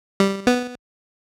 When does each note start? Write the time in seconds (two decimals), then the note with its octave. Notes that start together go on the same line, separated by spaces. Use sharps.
0.20 G3
0.47 B3